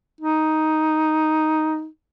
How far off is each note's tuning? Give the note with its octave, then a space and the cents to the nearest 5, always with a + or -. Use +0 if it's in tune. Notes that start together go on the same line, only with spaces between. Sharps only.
D#4 +5